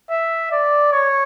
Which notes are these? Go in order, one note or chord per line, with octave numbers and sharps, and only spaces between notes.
E5
D5
C#5